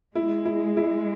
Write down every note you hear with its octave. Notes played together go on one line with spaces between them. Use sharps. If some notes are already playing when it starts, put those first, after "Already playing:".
G#3 E4
E4
E4